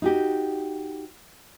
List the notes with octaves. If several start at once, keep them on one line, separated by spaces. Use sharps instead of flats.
D#4 F#4 G4